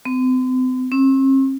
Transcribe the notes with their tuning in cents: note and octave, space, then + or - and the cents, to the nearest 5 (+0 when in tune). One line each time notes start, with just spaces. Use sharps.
C4 -40
C4 +45